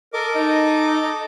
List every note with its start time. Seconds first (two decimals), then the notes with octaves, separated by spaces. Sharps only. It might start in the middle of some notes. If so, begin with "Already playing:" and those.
0.14 A4 A#4 D#5 D6
0.35 D#4